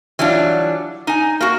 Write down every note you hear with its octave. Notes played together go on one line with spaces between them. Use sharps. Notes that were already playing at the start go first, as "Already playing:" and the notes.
E3 F#3 G3 D4 F4
D#4 G#5
A#3 F#4